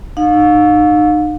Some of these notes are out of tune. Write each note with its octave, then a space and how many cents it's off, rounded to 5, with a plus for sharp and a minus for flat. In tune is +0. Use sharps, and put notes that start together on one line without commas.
D#4 -35 F5 +35